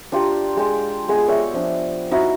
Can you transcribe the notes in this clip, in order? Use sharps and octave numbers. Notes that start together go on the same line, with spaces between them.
D4 F4 G4 A#5
G#3 G5
G#3 B3 G#4 D#5
C#5 D5 E5 G5
F3 D4
D#4 E4 F#4